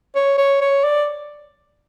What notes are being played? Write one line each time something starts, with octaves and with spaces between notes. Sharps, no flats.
C#5
C#5
C#5
D5